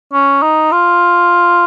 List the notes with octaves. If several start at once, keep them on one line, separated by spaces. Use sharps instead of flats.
C#4
D#4
F4